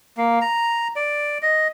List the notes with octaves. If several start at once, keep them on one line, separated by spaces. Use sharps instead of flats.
A#3
A#5
D5
D#5